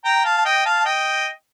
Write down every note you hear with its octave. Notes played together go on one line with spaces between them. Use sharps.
G5 A#5
F5 A5
A5
D#5 G5
F5 A5
A5
D#5 G5